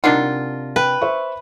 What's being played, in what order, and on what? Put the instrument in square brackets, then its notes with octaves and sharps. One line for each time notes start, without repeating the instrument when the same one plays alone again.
[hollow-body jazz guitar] C3 A#4 F#5 [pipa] D4 D#4 F4
[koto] B4 [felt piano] G5
[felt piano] C5 E5 C#6